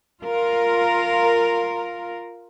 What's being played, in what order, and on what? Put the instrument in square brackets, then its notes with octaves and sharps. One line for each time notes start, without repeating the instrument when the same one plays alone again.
[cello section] F4 A#4